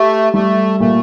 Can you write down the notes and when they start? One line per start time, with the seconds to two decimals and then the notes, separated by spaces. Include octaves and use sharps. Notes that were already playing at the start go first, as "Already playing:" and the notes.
Already playing: A3 G4
0.34 G3 A3
0.80 A#2 A3